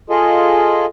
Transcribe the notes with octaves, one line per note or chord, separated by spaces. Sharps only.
F4 G#4 A4 D#5